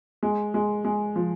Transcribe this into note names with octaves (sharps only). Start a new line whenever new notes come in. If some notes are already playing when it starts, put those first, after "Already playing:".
G#3
G#3
G#3
F3